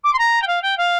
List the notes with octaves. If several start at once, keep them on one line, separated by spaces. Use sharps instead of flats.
D6
C6
A#5
G5
F5
G5
F5